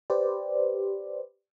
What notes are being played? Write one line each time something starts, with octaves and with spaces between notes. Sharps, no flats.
G4 B4 C5 D5